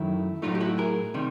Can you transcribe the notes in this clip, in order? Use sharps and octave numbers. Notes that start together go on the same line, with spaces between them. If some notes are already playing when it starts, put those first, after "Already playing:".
Already playing: F#2 D#3 F#3 A3 E4
A2 F#3 A3 D#4 F4
G4
E4 F#4
G#4 A#4
C3 D#3 G3